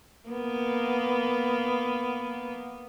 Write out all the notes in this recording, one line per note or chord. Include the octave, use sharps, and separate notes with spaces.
A#3 B3